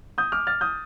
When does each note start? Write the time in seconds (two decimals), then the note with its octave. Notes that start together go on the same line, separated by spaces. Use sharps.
0.18 D#6 G6
0.32 D6 F6
0.47 F6 A6
0.61 D#6 G6